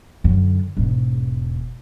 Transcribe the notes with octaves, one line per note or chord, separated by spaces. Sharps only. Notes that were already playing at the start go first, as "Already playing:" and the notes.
F#2 D3
E1 G#2